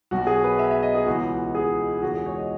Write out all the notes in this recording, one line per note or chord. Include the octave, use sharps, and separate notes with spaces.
B1 B2 F#3 F#4
G#4
B4
E5
E5
D#5
G#4
C#2 C#3 E3 B3 F#4
G#4
E1 E2 C#3 E3 G#3 F#4
G#4
C#5
D#5